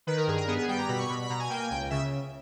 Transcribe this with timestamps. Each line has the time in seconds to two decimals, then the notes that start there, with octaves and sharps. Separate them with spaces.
0.07 D#3 B4
0.17 A#4
0.27 G2 G#4
0.37 A#4
0.48 B3 G#4
0.58 G#4
0.68 G3 G5
0.78 A#5
0.89 B2 B5
0.98 C#6
1.09 B2 B5
1.20 B5
1.30 B2 A#5
1.40 G#5
1.50 A#3 G5
1.60 G#5
1.71 C#2 G5
1.90 C#3 E5